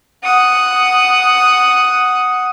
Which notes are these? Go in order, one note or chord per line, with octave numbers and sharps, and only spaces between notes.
F#5 D#6